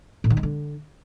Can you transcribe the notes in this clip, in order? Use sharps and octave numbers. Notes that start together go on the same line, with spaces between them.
A2
D#3
G#3
D3